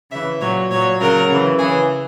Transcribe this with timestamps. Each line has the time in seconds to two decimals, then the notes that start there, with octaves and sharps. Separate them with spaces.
0.11 C#3 E3 E5
0.41 A#2 F#3 C#5
0.70 A#2 F#3 C#5
1.00 C#3 F#3 A#4
1.29 C#3 E3
1.58 C#3 E3 G#4